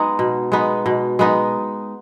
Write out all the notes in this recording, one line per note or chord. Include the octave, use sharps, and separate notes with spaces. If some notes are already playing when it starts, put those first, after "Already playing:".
Already playing: G#3 B3 D#4
B2
G#3 B3 D#4
B2
G#3 B3 D#4